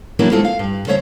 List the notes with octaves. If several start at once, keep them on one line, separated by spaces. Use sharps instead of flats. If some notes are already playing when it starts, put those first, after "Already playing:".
E3 F#3 A#3 B3 D4 E4
G#3 A3 C4 F4 A4
F5
G2
C#3 A3 C5 C#5 D#5 E5